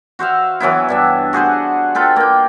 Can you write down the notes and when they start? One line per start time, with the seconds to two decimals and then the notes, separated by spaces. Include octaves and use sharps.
0.19 F#4 C5 E5 F5
0.60 E3 F#3 B3 E4
0.89 G2 D4 E5
1.33 F#4 G#4 C5 F#5
1.95 F4 A4 B4 G5
2.16 A#3 G5